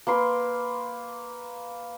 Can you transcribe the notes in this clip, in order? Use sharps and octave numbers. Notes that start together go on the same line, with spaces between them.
A#3 B4 C6 D6